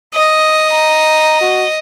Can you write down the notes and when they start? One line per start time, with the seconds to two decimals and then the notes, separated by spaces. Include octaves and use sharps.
0.15 D#5 D#6
0.70 A#5
1.41 F#4